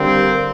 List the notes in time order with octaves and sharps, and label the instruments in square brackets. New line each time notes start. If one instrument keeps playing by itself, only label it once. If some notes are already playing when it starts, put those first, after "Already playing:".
Already playing: [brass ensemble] D3 G3 A#3 C4